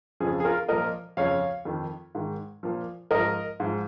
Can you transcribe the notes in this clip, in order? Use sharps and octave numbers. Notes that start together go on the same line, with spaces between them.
F2 C#3 F3 G#4
G#4
F4 A#4
A#2 F3 A#4 D#5
F2 C#3 F3 C#5 F5
F2 D#3
G#2 D#3
A#2 F3
G#2 F3 A#4 D#5
G#2 F3